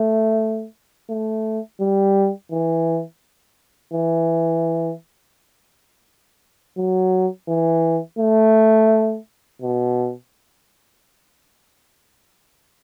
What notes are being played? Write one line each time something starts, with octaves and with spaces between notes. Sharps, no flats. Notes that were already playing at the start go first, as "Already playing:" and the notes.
Already playing: A3
A3
G3
E3
E3
F#3
E3
A3
B2